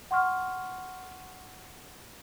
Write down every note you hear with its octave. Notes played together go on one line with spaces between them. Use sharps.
F#5 C6 C#6 F6